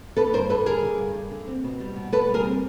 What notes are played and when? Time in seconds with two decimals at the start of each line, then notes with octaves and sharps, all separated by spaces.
0.17 D3 A4 B4
0.33 G2 A#4 C5
0.50 D3 A4 B4
0.66 G2 G#4 A#4
0.82 D3
0.98 G2
1.14 G2
1.32 D3
1.48 C4
1.64 B2
1.80 G3
1.96 B2
2.12 B2 A4 B4
2.29 G3
2.34 G#4 A#4
2.45 C4